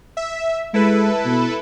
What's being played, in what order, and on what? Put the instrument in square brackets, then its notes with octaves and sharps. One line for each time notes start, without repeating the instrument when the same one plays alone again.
[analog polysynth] E5
[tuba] G#3 [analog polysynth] E4 A4 B4
[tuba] B2